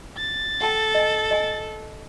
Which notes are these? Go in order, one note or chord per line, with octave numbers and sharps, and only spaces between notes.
A6
A4 F#5 G5 A5
D#5 G#5
D#5 G#5